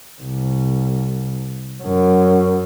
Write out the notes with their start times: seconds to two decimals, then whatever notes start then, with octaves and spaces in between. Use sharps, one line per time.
0.22 C2
1.83 F#2